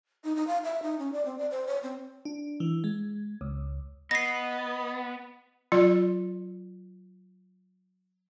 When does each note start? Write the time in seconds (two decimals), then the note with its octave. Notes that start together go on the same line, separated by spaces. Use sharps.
0.24 D#4
0.36 D#4
0.47 F5
0.64 E5
0.83 D#4
0.99 C#4
1.13 D5
1.25 C4
1.38 D5
1.51 C5
1.67 C#5
1.83 C4
2.25 D4
2.60 E3
2.84 G#3
3.41 C#2
4.11 B3 D#5 B5 A#6 C7
5.72 F#3 F4 D5